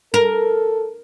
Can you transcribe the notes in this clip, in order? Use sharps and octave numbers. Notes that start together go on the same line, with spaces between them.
A4 A#4